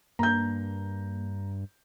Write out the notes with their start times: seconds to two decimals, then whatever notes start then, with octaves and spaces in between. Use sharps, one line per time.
0.19 G2 A#3 A#5 G6